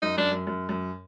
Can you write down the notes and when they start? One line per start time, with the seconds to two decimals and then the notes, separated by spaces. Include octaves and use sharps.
0.02 F#2 D#4
0.17 F#2 D4
0.31 F#2
0.47 F#2
0.69 F#2